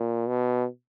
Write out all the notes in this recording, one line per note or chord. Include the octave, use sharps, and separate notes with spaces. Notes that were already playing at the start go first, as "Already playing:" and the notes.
Already playing: A#2
B2